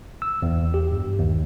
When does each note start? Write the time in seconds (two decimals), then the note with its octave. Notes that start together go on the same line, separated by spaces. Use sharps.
0.22 E6
0.42 E2
0.74 G4
0.92 G2
1.19 D#2